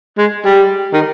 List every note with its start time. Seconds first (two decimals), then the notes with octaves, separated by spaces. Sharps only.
0.18 G#3
0.45 G3
0.93 D#3